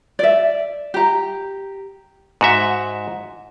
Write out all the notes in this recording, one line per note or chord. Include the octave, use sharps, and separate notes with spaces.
D5 E5
G4 A#5
G#2 F#4 E5